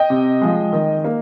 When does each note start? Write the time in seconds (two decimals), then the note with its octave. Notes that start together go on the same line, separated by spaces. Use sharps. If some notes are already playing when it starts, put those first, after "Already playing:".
Already playing: D#5 G5
0.10 C3
0.41 F3 G#3
0.73 D#3
1.04 A#3